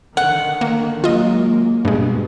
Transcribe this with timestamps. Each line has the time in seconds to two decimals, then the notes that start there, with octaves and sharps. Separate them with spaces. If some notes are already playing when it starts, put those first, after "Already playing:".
0.17 D3 D#3 F#5
0.61 A#3
1.04 F#3 G#3 A#3 F4 D#5
1.85 G2 B2 G#3